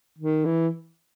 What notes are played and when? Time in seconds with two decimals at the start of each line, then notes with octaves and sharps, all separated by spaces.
0.18 D#3
0.45 E3